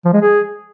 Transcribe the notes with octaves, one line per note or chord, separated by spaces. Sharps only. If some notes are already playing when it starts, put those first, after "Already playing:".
F3
G#3
G#4